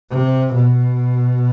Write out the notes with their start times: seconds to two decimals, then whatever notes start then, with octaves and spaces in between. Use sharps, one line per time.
0.10 C3
0.54 B2